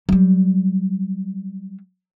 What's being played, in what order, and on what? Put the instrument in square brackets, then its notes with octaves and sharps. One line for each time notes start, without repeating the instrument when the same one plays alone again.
[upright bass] F#3 G3